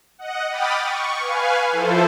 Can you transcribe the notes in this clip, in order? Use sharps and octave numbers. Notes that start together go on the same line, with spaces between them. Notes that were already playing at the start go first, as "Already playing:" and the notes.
D#5 F#5
G5 B5 D6 D#6 F6 A6
C#6
B4 F5 G#5
F3 E4 A4 C5